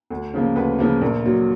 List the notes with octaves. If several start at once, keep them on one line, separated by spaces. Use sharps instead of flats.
D2
C#3 F3 A#3
D2 B4
C#3 F3 A#3
A#1 A#4
A#2 F#3